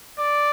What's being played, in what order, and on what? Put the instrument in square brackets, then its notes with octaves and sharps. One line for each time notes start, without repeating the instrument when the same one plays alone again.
[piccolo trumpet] D5